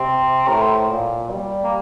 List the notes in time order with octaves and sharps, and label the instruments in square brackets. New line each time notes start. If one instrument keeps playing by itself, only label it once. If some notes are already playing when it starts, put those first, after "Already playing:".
Already playing: [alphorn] C3 [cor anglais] C4
[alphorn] A2 [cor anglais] A#4
[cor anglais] C5
[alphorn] A#2
G3
[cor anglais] A#3